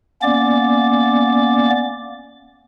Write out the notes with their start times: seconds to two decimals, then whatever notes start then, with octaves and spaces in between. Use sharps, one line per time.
0.22 A#3 B3 C#4 D5 D6